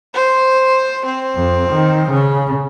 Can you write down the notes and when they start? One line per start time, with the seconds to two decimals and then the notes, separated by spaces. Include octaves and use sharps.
0.14 C5
1.06 C4
1.35 F2
1.68 D#3
2.10 C#3